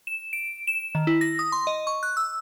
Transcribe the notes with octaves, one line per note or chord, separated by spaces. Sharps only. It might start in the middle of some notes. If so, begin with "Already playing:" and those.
E7
D7
E7
D#3
E4
A#6
D#6
C6
D#5
C#6
F#6
E6